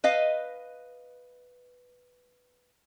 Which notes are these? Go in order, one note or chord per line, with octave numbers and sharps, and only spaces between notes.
B4 D#5 F5